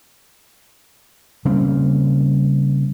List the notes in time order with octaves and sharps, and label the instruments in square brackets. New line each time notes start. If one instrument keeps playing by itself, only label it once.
[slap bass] C#3 G3 A#3 C4